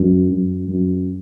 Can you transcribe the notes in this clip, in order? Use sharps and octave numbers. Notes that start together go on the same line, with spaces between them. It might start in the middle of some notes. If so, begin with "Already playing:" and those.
Already playing: F#2
F#2
F#2